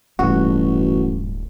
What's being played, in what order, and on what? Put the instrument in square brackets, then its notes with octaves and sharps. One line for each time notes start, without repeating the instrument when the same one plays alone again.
[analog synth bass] D1 [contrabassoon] A1 [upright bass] G2 A#2 [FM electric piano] F#4